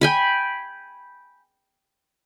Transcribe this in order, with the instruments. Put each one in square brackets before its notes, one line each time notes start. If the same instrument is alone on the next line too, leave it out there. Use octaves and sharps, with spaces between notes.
[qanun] G5 G#5 B5